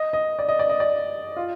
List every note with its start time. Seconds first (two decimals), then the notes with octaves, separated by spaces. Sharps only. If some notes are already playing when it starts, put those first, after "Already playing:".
Already playing: D#5
0.13 D#5
0.39 D5
0.48 D#5
0.59 D5
0.69 D#5
0.80 D5
1.36 F4